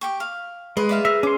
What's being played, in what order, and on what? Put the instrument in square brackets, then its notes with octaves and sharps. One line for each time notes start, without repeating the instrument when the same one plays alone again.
[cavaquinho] G4 G5 C#6
F5
[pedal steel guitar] G#3 [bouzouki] G#4 B4
[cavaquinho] D5 E5 F5
[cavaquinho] A#4 [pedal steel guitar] E5
[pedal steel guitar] C#4 C6 [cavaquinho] D6